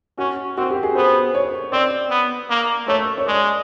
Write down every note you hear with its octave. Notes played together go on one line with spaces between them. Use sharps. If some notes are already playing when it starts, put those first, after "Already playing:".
C#4 F#4
C4 F#4
G4
G#4
B3 C5
C#5
C4 D5
B3
A#3
A3 C#5
C#5
G#3 D5